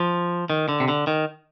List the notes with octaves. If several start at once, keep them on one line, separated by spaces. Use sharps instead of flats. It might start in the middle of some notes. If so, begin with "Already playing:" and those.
Already playing: F3
D#3
D3
C3
D3
D#3